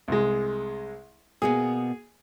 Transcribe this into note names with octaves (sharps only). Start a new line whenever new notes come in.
C2 G#3
B2 A#3 B3 G#4